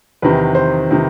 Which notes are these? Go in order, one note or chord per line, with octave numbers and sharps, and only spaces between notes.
E2 C3 D#3 B4
C5
C3 D#3